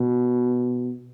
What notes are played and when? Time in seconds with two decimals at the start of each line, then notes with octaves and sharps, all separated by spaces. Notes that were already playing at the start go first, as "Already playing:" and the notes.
Already playing: B2